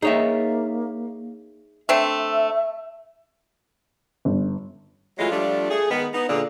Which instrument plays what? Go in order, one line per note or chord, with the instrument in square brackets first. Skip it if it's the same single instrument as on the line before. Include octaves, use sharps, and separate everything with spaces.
[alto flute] A#3 [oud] D#4 [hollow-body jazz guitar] G#4 C#5 E5
[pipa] A3 C4 D4 [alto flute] E5
[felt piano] G1
[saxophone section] E3 F#3 G#3 A3 F4
F3 G3 A3 D4 F4
A3 G#4
D#3 G#3 B3
B3 D#4
A#2 D3 D4 F4 G#4